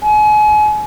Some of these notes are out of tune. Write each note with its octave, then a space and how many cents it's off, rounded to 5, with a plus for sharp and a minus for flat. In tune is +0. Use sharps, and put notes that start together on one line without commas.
G#5 +35